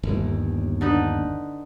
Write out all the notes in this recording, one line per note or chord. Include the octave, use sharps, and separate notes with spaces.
G1 D#2
D3 D#4 B4